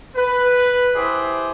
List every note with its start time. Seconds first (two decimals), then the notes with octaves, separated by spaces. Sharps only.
0.16 B4
0.96 E4 G4 G#4 C5 D5 E5